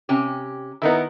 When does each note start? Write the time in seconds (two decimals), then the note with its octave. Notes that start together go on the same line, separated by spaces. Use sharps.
0.09 C3 C#4 G4
0.82 D#3 B3 D#4 E4 A#4